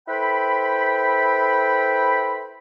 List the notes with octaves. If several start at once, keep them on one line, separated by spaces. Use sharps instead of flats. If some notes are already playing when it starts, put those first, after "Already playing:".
E4 A4 B4 C5 G5 B5